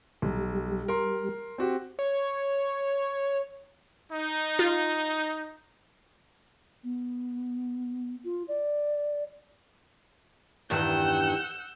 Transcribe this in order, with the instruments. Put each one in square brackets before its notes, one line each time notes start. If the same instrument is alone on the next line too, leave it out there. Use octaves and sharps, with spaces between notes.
[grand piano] B1 [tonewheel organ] G3
[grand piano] A#4 C6
C4 F#4 G4
[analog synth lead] C#5
[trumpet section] D#4
[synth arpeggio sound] F4
[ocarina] B3
F4
D5
[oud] E2 G2 D#3 [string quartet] F#5 E6 G6